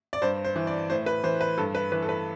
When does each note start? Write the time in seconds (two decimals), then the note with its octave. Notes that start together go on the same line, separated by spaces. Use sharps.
0.13 D5
0.22 G2 C5
0.45 C5
0.56 E3
0.67 D5
0.90 A2 C5
1.06 B4
1.24 E3 C5
1.41 B4
1.58 G2 A4
1.75 B4
1.92 E3 B4
2.02 A4
2.09 B4